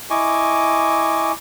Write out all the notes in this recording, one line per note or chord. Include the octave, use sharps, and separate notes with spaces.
E4 D#5 G#5 C#6 D6